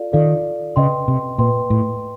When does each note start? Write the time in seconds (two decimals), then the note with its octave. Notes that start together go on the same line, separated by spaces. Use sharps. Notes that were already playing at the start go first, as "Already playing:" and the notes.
Already playing: F4 A4 D5 F5
0.13 D#3 F4 A4 D5 F5
0.76 C#3 B4 D#5 G5 C6
1.08 C3
1.38 A#2 B4 D#5 G5 C6
1.70 A2